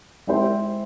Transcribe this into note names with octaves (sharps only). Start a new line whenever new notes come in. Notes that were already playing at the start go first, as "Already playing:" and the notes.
G#3 C4 E4 G4 C5